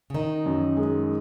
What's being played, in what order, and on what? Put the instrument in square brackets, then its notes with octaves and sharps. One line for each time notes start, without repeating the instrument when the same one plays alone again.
[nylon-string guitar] C#3
[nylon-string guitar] D#3 [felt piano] D#4
[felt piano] F#2
G#3